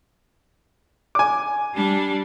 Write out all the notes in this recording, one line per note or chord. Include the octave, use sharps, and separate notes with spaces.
G#5 D6
G3 D4